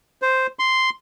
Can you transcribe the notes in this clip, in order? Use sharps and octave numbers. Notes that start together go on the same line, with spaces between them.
C5
C6